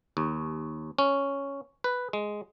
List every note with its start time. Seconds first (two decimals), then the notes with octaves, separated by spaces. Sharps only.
0.17 D#2
0.98 C#4
1.84 B4
2.13 G#3